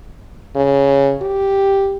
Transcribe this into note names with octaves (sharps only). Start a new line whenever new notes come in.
C#3
G4